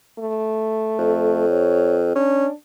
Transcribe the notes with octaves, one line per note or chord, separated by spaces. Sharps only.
A3
F2
C#5
C#4 D4